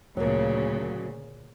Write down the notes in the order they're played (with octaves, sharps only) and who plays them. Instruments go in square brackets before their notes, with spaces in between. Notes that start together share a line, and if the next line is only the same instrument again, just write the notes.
[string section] D2 A#2 C#3 [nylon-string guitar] F#3 A#3